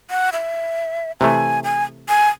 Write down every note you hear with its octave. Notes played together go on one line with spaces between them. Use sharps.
F#5
E5
C3 E3 A3 G#5
G#5
G#5